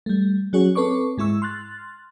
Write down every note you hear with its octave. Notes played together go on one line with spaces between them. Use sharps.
G3 A3
F#3 C#4 F#4 G#4 C#5
C4 A4 B4 C#5 C#6 D6
G#2 G#3 E4 C#6 E6
C6 F6 F#6 A6